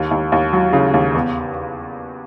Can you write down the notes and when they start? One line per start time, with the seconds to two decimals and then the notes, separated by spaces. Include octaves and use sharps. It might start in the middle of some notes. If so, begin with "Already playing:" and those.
Already playing: D#2
0.11 D#2
0.32 D#2
0.53 F#3
0.73 C#3
0.94 D#2
1.14 E2